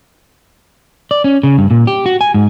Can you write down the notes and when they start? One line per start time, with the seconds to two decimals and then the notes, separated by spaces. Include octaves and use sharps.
1.11 D5
1.24 C#4
1.43 C#3
1.58 G2
1.71 A#2
1.87 G4
2.06 F#4
2.21 G#5
2.34 G#2